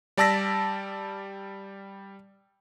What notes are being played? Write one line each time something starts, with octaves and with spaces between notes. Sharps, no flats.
G3 D5 A5 E6 A#6 B6